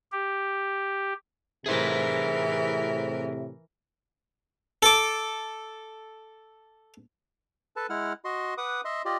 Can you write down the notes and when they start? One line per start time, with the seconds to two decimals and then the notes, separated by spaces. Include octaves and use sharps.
0.12 G4
1.66 A2 C3 E3 G#4 A#4 C5 E5
4.83 A4 D6
7.76 A4 B4 A5
7.90 G#3 E4 F#5 F6
8.25 F#4 D#5 C6
8.58 B4 F#5 D6 D#6
8.85 D#5 E5 C6
9.05 F4 G4 D5 D#5